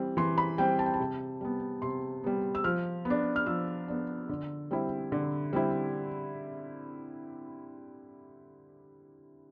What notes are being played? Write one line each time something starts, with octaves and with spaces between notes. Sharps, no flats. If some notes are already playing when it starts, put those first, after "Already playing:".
Already playing: E3 G3 C4
E3 C6
B5
G3 C4 G5
A5
G5
A5
C3
G3 B3
C3 C6
G3 B3
E6
F3 F6
B3
D4
F6
F3 E6
B3 D4
D3
G3 C4 E4
D3
G3 C4 E4